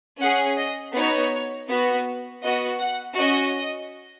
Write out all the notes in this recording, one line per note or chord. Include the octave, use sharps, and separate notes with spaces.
C#4 G#4 F#5
D#5
B3 D#4 F#4 C#5
B3 F#4
B3 F#4 D#5
F#5
C#4 F#4 D#5